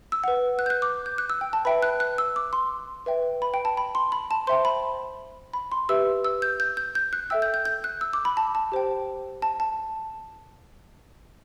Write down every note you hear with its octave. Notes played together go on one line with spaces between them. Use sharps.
E6
B4 F#5
F#6
G6
F#6
D6
G6
F#6
E6
G5
A5
B4 E5 G5 B5
F#6
F#6
E6
D6
C6
B4 E5 G5
B5
G5
A5
B5
C6
B5
A5
C5 E5 G5 C6
B5
B5
C6
G4 B4 E5 E6
E6
G6
G6
G6
G6
F#6
A4 E5 G5 E6
G6
G6
G6
F#6
E6
D6
B5
A5
A5
G4 C5 G5
A5
A5